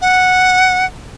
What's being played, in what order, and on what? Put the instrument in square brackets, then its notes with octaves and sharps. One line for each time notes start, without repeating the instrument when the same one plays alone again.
[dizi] F#5